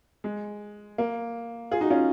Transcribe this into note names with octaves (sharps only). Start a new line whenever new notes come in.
G#3
A#3
F4 G#4
D#4 F#4
C#4 F4